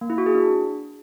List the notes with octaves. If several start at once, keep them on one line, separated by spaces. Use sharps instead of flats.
A#3
E4
F#4
G#4
D4